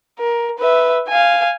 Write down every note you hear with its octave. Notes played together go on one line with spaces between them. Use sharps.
A#4
B4 E5
F5 G#5